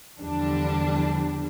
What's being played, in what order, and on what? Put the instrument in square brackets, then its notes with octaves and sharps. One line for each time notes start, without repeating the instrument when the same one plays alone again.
[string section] E2 D3 F3 G3 D4